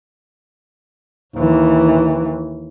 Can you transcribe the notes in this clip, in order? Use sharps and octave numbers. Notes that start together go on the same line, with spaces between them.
D#2 E3